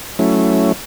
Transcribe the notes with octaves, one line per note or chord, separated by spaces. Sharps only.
F#3 A3 C#4 E4